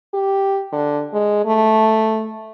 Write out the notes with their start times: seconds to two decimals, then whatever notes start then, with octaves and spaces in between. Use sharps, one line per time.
0.14 G4
0.73 D3
1.13 G#3
1.45 A3